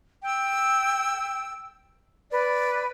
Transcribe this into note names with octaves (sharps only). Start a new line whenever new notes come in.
G5 E6
B4 D5